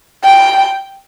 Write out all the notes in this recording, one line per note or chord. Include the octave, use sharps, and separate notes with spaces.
G5